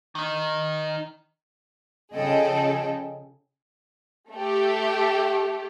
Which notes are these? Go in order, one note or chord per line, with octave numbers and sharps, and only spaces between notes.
D#3 D#4
C#3 F3 G#4 A4 D#5 G5
A3 G4